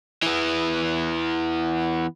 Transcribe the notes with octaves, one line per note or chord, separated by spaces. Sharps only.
E3 B3